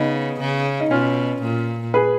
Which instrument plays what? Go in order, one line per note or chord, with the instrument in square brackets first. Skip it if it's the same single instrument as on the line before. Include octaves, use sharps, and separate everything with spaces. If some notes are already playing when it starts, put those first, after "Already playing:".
Already playing: [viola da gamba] C#3 [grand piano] B3 D#4
[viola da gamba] C#3
[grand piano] D#4
[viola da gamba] B2 [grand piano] C#4 F4
[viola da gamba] A#2
[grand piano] G#4 B4